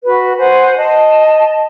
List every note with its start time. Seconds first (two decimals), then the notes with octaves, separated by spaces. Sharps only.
0.03 F#4 B4
0.38 C5 F#5 G#5
0.77 D#5 A5